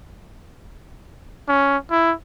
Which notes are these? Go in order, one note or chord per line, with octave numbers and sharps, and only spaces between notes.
C#4
E4